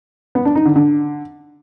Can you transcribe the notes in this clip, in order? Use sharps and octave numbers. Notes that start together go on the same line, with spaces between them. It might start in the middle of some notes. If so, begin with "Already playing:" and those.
B3
D4
D#4
D3
D3